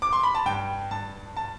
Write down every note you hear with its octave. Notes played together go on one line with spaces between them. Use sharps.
D6
C6
B5
A5
G2 G5
G2 A5
A5